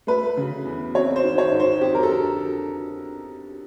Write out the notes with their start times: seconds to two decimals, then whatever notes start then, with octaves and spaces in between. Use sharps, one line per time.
0.07 A3 B4
0.37 C#3
0.65 E2
0.95 C4 C#5
1.16 C5
1.24 D#3
1.38 C#5
1.52 G#2
1.60 C5
1.81 F2 G4
1.95 A#4
2.03 A4
2.10 D3